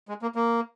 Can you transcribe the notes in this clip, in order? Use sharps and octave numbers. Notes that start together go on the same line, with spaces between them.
G#3
A#3
A#3